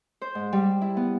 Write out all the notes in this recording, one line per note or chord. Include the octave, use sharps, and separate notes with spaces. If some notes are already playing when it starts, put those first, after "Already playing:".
C5
G#2
G3
E4
B3